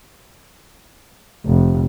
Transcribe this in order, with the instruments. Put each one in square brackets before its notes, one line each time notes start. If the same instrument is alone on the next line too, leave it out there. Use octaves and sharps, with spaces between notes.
[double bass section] F1